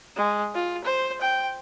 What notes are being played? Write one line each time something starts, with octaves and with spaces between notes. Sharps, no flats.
G#3
F4
C5
G5